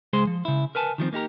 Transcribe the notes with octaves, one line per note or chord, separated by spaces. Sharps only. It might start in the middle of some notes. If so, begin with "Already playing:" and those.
C#2 G#3 G#4 C5 C6
F3
C#3 E4
A#4 B4 G#5 A5
D#3 F3 G3 C4
A#3 D#4 G4 A#4